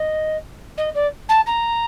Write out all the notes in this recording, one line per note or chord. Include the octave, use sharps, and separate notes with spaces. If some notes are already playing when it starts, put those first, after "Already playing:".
Already playing: D#5
D#5
D5
A5
A#5